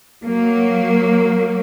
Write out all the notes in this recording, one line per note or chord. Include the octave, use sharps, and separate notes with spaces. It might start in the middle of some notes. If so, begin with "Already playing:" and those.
F#3 A#3